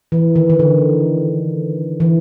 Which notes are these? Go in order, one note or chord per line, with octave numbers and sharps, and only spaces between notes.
E3
D#3
D#3
D3
E3